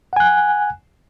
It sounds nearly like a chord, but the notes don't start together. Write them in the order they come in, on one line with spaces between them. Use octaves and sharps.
F#5 G#5 F#6